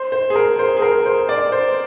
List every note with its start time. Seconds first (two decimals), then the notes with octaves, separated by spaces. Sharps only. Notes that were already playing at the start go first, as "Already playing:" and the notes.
Already playing: C5
0.12 C5
0.30 G#4
0.36 A#4
0.59 C5
0.77 G#4
0.82 A#4
1.06 C5
1.29 D5
1.52 C5